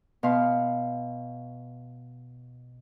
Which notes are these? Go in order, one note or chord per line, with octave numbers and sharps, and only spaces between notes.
B2 F5 C6